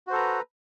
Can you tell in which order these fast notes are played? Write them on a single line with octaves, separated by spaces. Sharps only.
F#4 C5 A4 A#5 B4